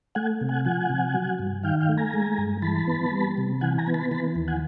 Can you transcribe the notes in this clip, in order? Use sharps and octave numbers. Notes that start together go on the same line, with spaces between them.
A3 F#5 G#5
C3
F#5 G#5
F3 F#5 G#5
C3
F#3
G2
D#3 F5 G5
F5 G5
A3
G#5 A#5
G#3
G2
E3 A5 B5
B3
G3
C3
E3 F#5 G#5
G#5 A#5
B3
A5 B5
E3 A5 B5
D#2
F#5 G#5